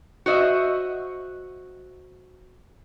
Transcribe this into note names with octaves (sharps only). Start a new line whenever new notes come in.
F#4 C5 D#5 E5